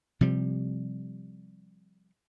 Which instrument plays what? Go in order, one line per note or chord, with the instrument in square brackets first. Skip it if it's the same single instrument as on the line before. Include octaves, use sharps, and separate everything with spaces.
[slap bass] C3 F3 G3